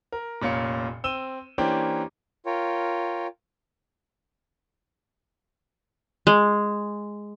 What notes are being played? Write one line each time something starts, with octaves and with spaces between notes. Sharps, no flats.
A#4
F1 A#2 C#4 F5 C#7
C4 E6 D#7 E7 G7
E3 A#3 C#4 D4 G4 C5
F4 A#4 C#5 G5
G#3